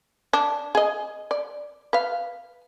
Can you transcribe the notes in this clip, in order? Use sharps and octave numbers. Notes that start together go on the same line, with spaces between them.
D4
G#4 D#5
D5
B4 F5